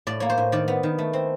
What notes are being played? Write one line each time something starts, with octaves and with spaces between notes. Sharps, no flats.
A2 D5
A#3 C#5
C5
A2
D#3 D5
B3
D#3
A3
C4